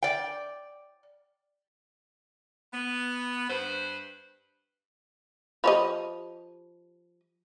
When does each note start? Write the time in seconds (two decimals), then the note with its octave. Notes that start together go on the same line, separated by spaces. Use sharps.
0.03 D5 G5
2.74 B3
3.50 G2 B4 C5
5.64 F3 G4 C#5 D#5 B5